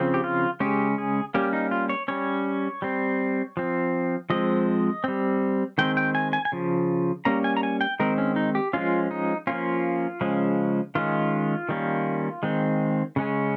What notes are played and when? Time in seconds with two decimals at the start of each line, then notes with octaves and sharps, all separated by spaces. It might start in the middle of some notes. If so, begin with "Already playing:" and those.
Already playing: C#3 F3 C4
0.14 G4
0.24 F4
0.60 C#3 G#3 C#4 G4
0.98 G#4
1.34 G3 A#3 C#4 G4
1.53 D#4
1.71 F4
1.89 C#5
2.08 G3 C#4 C#5
2.82 G3 C4
3.57 F3 C4
4.30 F3 G#3 C4 D#5
5.04 G3 C4
5.78 D#3 G#3 C4 G5
5.97 G5
6.15 G#5
6.33 G#5
6.45 G#5
6.52 C#3 F3
7.25 G3 A#3 C#4 A#5
7.44 G#5
7.57 A#5
7.63 G#5
7.81 G5
8.00 D#3 G#3 C4 A#4
8.18 C#4
8.36 D#4
8.55 G4
8.73 F3 G#3 C#4 F4
9.11 D#4
9.47 F3 A#3 C#4 F4
10.21 C#3 F3 G#3 C#4
10.95 D#3 G#3 C#4 F4
11.69 D#3 G3 A#3 C#4
12.43 D#3 G#3 C4
13.16 C#3 G#3 C#4